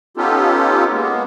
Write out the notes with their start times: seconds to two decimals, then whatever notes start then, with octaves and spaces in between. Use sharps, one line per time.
0.17 B3 C#4 D#4 F4 G4 A4
0.92 G#3 A#3 B3